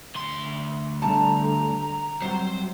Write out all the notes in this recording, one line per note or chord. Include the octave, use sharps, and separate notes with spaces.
D2 C6
E2 D3 G3 A5 A#5
C3 F#3 G3 C4 C5